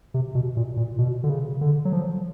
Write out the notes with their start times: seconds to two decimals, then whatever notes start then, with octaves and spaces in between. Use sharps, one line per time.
0.14 C3
0.35 B2
0.57 A#2
0.77 A#2
0.98 B2
1.23 D3
1.30 C#3
1.61 D3
1.85 F#3
1.92 F3